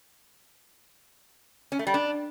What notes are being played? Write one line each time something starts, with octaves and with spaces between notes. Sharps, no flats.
C#4
A3
G3
D4